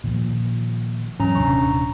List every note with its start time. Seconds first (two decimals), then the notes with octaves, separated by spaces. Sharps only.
0.04 A#2 D#3 F3
1.20 G#2 E3 F#3 C#4 A#5
1.35 D#1 C3 D4 A#5 C#6